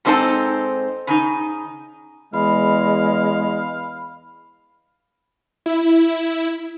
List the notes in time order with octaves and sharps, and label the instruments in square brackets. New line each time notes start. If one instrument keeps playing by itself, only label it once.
[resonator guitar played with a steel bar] G#2 G3 C4 D#4 A4 A5
C#3 D#4
[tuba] E2 [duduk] G#3 [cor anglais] F5 [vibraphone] B5
[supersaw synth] E4